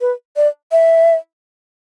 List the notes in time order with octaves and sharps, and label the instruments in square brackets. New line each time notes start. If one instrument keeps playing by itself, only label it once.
[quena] B4
D5
E5